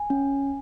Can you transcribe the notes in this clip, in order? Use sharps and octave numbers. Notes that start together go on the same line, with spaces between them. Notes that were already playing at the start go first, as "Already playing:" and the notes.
Already playing: G#5
C#4